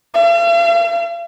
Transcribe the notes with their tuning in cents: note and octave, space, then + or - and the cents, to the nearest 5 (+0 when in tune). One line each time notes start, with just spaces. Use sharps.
F5 -45